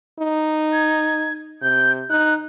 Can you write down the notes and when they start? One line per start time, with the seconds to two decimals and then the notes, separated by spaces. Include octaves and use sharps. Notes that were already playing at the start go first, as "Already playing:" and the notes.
0.19 D#4
0.73 G#6
1.62 C3 G6
2.10 D#4 F#6